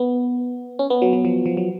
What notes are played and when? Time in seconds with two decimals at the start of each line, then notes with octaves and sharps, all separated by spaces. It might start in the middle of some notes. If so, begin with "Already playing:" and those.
Already playing: B3
0.79 C#4
0.90 B3
1.02 F#3
1.13 F#3
1.25 F3
1.46 F3
1.57 F#3